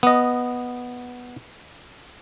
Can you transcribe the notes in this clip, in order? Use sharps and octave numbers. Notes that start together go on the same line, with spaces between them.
B3 D#5